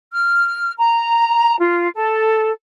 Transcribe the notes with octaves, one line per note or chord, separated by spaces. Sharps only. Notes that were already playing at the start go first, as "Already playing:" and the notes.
F6
A#5
F4
A4